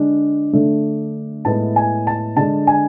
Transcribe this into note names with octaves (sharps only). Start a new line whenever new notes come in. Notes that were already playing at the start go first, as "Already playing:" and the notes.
Already playing: D3 G#3 D4
D3 A3 D4
A2 G#3 B3 E4 A5
G#5
A5
D3 G#3 D4 A5
G#5